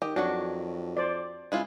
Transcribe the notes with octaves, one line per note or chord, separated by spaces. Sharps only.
D#3 G4 D#5
F2 D#3 F#3 D4 F#4
C5 D5
C#2 G#3 E4 F4